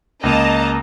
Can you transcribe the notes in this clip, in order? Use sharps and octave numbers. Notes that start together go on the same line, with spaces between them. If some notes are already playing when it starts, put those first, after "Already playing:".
C#2 A#3 D#5 A5 A#5